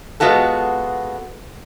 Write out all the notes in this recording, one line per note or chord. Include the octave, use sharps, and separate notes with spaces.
G#3 B3 F4 F#4 A4